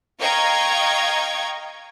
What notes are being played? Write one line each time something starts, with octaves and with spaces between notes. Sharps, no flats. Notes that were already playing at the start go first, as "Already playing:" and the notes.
D#5 F5 G5 A#5 C#6 G#6